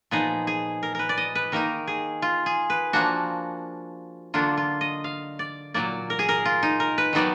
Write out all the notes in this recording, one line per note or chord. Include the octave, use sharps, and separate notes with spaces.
A#2 F3 B3 D#4 G#4
G#4
A#4
A#4 B4
D5
D#5
B4
D#3 A#3 D#4 A#4
G#4
F4
G#4
B4
F3 A#3 D4 F#4
D3 F#3 A#3 D4 F4
F4
D#5
F5
D5
A#2 F#3 A#3 D5
A#4
G#4
A#4
F4
D#4
A#4
B4
D#3 F#3 B3 D#4 D5